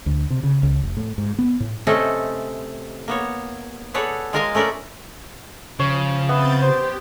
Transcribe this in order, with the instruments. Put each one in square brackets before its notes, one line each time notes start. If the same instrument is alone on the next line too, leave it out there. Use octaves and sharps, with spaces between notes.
[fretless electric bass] D2
C3
C#3
C#2
F1
A2
G#2
B3
A2
[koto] C3 A3 C4 C#4 A4 D#5
A#3 B3 C#5
G#4 A4 B4 C#5 D5 F#5
G#3 F4 A#4 D#5 F5 G#5
A3 C#4 A#4 B4 D5
[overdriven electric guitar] C#3 [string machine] F3 [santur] C#5
[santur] B3 [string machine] C4 G6 A6 [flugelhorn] E5
[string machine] G4 [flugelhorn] C5